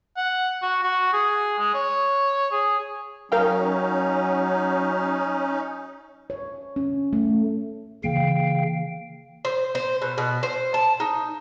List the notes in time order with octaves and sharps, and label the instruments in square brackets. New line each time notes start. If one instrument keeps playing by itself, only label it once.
[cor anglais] F#5
F#4
F#4
G#4
G#3
C#5
G#4
[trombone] F#3 [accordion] C#4 D#4 [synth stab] A#4 F5 G5
[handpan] C#5
C#4
A3
[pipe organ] C#3 F5 G5 [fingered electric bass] E3 A#3
[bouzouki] C5
C5
B2
B2
C5
A5
D#4